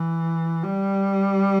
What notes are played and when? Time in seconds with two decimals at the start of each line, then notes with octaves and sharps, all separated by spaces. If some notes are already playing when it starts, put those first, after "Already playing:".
Already playing: E3
0.63 G3